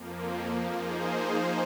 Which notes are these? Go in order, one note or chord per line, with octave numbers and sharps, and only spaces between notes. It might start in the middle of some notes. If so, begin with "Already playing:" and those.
Already playing: F2 F3 A#3
F3 A#3 D#4 G#4 C5